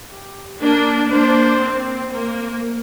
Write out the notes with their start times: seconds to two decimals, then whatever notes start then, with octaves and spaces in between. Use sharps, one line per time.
0.12 G4
0.62 A#3 D4 A#4
1.11 A#3 D4 C5
1.61 C4
2.11 A#3 C5